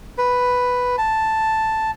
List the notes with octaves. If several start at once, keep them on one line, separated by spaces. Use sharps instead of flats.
B4
A5